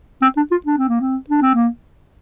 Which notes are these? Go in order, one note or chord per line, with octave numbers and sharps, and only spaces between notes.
C4
D4
F4
D4
C4
A#3
C4
D4
C4
A#3